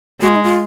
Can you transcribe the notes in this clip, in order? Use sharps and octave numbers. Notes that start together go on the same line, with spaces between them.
G#3 F#4
F4
D#4
F4